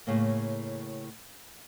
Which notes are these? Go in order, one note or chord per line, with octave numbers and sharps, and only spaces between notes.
A2 C#3 A#3